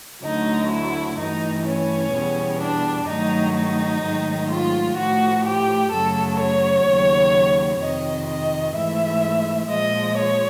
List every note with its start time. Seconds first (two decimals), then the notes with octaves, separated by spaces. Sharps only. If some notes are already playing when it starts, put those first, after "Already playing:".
0.24 D2 D3 F#3 A3 D#4
0.71 E4
1.18 G2 E3 A3 D#4
1.67 C#4
2.14 E2 B2 G3
2.61 D4
3.07 G2 D#3 F#3 A3 D#4
3.56 D#4
4.03 G#2 D#3 F#3 A3
4.50 F4
4.97 A2 F3 A3 F#4
5.45 G4
5.91 F#2 C#3 F#3 A3 A4
6.39 C#5
6.86 D#2 C#3 F#3
7.80 F2 C3 D#3 D#5
8.28 D#5
8.75 G#2 E3 A3 E5
9.69 A#2 F3 G#3 D#5
10.17 C#5